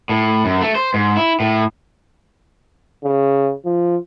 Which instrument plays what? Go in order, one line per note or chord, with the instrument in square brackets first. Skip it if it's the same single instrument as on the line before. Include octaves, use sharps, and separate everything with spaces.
[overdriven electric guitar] A2
F#2
A3
C5
G#2
E4
A2
[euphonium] C#3
F3